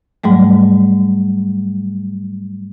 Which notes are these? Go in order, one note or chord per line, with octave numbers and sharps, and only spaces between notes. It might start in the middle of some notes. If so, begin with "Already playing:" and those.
G#2 F#3 G3 A3